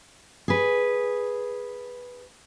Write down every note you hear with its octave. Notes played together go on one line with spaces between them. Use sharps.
G#4 B4